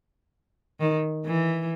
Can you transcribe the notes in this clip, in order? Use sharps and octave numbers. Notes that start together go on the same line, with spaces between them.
D#3
E3